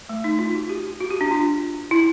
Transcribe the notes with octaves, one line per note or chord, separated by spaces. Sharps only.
A3
D#4
F4
F#4
G4
F#4
G4
D4
F4
E4